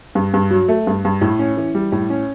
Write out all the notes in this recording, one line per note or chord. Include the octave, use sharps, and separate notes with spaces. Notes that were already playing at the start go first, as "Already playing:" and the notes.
G2
G2
F#3
A3
G2
G2
A2
C#4
E3
G3
A2
C#4